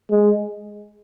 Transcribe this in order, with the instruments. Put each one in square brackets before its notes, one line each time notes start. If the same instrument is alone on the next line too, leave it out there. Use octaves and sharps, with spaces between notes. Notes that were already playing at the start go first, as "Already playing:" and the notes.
[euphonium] G#3